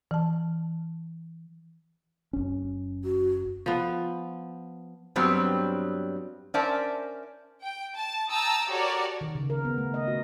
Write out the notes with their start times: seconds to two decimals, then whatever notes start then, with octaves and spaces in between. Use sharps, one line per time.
0.11 E3 A5
2.33 F#1 C#4
3.04 F#4
3.66 F3 B3
5.16 G2 F#3 G3 B3 C4
6.54 C#4 A#4 C5 D5 E5 A5
7.63 G5
7.96 A5
8.30 G5 A5 A#5 D#6 E6
8.68 F#4 G4 A4 A#4 C#5 D5
9.21 D#3
9.35 C#3
9.50 A#4
9.65 B3
9.78 A3
9.94 D#5
10.08 F#4